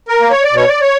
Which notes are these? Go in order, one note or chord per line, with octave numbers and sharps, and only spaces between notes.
A#4
A#3
C#5
D5
B2 C#5
D5
C#5